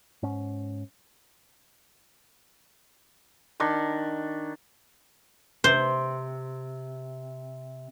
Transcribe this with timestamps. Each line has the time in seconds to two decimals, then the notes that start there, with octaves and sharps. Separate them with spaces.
0.23 G#2 C#4
3.60 D#3 D4 C#6
5.64 C3 C5